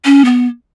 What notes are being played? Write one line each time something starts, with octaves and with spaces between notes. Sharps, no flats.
C#4
B3